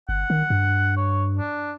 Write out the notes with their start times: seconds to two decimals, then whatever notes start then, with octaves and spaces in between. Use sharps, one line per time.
0.09 G1 F#5
0.30 D#3
0.50 G2
0.97 C#5
1.38 D4